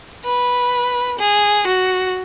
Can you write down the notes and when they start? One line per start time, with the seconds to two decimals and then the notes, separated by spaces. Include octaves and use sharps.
0.25 B4
1.19 G#4
1.67 F#4